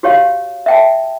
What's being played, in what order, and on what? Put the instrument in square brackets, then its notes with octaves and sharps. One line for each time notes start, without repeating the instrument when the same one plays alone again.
[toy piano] F#4 G4 C#5 F5
E5 G5 A5